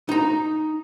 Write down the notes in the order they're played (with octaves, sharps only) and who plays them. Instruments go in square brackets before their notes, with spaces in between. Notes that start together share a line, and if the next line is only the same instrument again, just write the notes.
[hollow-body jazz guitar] D#4 A#5